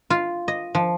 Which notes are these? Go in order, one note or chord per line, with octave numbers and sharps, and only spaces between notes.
F4
D#5
F3